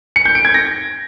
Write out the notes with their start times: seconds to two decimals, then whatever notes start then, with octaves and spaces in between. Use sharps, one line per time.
0.16 C#7
0.26 G6
0.35 D7
0.45 G#6
0.54 A#6